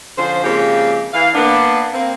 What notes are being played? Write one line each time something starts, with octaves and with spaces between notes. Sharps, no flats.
D3 F3 C#4 C5
C#3 F3 G#3 A#3 C4 G4
E3 F5
A#3 B3 D4
A#3 C4